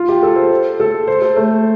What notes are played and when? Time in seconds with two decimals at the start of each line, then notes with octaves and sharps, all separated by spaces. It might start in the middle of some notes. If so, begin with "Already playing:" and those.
Already playing: F4
0.08 G4
0.23 A4
0.36 C5
0.80 A4
1.07 C5
1.22 A4
1.37 A3